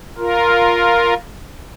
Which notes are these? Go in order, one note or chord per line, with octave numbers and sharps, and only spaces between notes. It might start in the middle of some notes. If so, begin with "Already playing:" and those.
F4 A#4